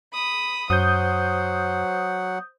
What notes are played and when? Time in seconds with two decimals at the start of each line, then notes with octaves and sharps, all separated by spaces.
0.13 B5 D#6
0.70 F#2 F#3 C5 F#5 D#6 G6